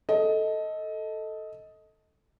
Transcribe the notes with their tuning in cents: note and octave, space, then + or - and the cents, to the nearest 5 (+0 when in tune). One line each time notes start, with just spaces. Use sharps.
A4 +0 D#5 +15